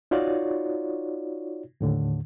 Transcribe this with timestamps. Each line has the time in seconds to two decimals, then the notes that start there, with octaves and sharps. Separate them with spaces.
0.11 D#4 F4 F#4 C#5 D5
1.81 D#2 A2 D3